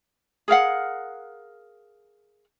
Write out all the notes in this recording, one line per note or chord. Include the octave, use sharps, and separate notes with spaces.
G#4 A#4 F5 F#5